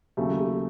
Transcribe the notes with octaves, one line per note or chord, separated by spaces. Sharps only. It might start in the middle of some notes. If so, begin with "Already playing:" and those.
D#2 C#3 F#3 A3 G4
G4